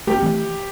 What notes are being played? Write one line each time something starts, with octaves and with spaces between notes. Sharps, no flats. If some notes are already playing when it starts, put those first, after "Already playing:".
A3 G4
C4
E3 A3